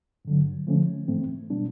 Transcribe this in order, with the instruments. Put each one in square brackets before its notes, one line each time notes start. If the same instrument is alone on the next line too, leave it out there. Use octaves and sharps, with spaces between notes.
[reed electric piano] G2 D3 F#3
D3 F3 A3 C#4
G#2 E3 A3 C4
B2 G3 B3 D4